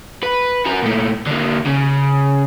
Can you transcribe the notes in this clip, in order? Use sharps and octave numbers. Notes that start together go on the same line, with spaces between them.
B4
F#4 A#4
A#2 A3
D3 A#3
C#3